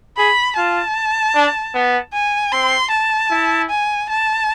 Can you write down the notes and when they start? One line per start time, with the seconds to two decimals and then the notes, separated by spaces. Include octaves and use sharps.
0.17 G#4 B5
0.57 F4 A5
1.35 D4
1.74 B3
2.14 G#5
2.52 C4 C6
2.91 A5
3.31 E4
3.70 G#5
4.09 A5